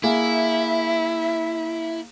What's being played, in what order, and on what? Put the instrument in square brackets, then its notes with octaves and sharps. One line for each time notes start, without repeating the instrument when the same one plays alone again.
[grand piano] A#3 G#4 [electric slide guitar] E4 [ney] E5